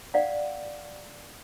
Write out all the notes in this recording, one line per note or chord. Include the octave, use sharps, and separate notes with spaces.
D5 F5 F#5